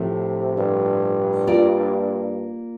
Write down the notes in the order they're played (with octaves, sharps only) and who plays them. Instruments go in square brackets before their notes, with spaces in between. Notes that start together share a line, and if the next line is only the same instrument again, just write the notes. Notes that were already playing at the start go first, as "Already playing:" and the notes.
Already playing: [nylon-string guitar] A2 F3 C4 E4 A4 [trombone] C3
[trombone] G2
[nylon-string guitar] A#3 F4 A#4 D5